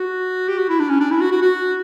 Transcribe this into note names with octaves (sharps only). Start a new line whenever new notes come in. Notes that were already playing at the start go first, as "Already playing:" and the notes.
Already playing: F#4
G4
F#4
E4
D4
C#4
D4
E4
F#4
F#4
F#4